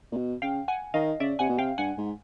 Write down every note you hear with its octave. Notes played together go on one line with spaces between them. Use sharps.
A#2
B2
C#3 F5 G5
F#5 G#5
D#3 D#5 F5
C#3 D5 E5
C3 F#5 G#5
B2
C3 F5 G5
G2 F#5 G#5
G#2